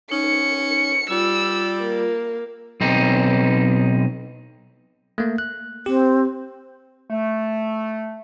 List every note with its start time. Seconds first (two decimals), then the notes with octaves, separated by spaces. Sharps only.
0.12 C#4 D#4 C#7
1.10 G3 F4 E6
1.81 A#3
2.81 B1 C4 D#4
5.18 A3 A#3
5.38 F#6
5.86 C4 G4
7.10 A3